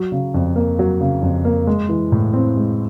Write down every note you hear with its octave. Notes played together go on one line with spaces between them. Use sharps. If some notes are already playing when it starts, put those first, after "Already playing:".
Already playing: F#3
C#3
F2
A#3
F#3
C#3
F2
A#3
G#3
E3
A2
C4
G#3